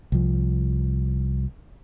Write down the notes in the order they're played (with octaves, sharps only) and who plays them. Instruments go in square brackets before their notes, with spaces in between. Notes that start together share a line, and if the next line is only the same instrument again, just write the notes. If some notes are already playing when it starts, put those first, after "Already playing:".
[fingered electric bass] C2 F3